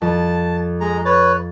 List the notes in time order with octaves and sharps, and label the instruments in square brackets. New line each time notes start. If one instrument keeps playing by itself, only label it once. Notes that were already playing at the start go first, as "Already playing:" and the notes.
[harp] F2 [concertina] A5
[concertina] G#3 A#5
[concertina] B4 C#5 [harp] A6